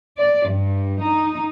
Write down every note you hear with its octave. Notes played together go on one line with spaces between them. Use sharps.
D5
G2
D#4